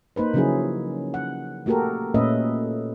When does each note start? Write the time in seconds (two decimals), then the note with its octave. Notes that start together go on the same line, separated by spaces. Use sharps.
0.16 A#3 D#4 B4 C5
0.34 C#3 F3 F#3 C#4 E4 G#4
1.14 F#5
1.66 A3 A#3 F#4 G4 A4 A#4
2.14 A#2 A3 C#4 B4 D#5 E5